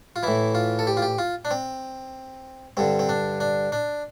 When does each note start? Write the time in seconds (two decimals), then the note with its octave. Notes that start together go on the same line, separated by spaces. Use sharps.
0.16 F4
0.23 A2 E3 E4
0.55 F4
0.79 A4
0.87 G4
0.97 F4
1.02 G4
1.19 F4
1.45 D4
1.51 C4
2.77 G2 D3 C4
2.99 C4
3.09 D4
3.40 D4
3.72 D4